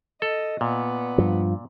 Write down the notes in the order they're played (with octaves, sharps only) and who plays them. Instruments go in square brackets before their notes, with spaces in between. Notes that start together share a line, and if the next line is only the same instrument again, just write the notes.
[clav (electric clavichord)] A4 [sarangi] D#5
[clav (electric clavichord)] A#2 [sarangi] B3
[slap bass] G2 F3